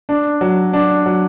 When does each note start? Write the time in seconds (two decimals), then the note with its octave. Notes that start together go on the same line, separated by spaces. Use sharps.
0.09 D4
0.41 F#3
0.73 D4
1.06 F#3